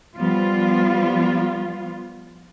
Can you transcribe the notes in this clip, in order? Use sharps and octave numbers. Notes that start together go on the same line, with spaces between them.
F3 G3 B3 F4